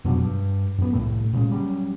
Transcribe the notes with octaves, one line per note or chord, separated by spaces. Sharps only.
F2 B2 F#3 D4
G2
F#2 B3
C2 A2 A3
A#2 C#3 G#3
F#3 G3 C#4